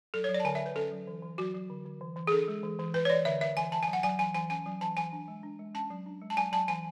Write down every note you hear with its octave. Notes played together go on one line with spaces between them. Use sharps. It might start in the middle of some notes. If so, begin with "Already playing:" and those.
F#3 A4
C#5
F#3
D5
A5
D3 G#5
E5
D3
B4
C#4 A4
F#3
E3
E3
F#3 F#4
F#3
D3
D3
E3
E3
G#4
D4 A4
G#3
E3
E3
E3 B4
C#5
E3 D5
D3 E5
D3 E5
E3 G#5
E3 A5
G#5
F#3
F#5
F#3 G#5
E3 G#5
E3 G#5
C#4 G#5
F#3
E3 A5
E3 G#5
D4
G#3
D4
G#3
C#4 A5
F#3
D4
G#3
A5
F#3 G#5
F#3 A5
E3 G#5